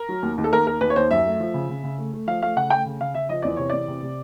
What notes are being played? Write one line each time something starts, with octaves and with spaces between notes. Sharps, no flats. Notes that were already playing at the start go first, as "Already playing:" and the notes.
Already playing: A#4
F#3
D#2
D#2
A4
D#2 A#4
D#2 A#4
D#2 B4
C#5
D#2 C5
F#2 E5
A3
F3
C#3
C#3
C#3
A3
A3
F3 F5
A3 F5
C#3 F#5
A3 G5
C#3
C#3 F5
C#3 E5
F3 D#5
E2 D5
C3 C#5
E2 D5
C3
C3